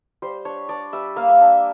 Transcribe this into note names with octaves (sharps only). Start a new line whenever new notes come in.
G3 C5
D4 C#5
D4 D5
G3 E5
A#3 F5
E5
D4